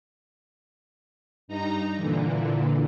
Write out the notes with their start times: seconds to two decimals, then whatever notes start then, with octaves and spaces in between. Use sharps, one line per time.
1.48 G2 D#4 A#5
1.96 A#2 D3 E3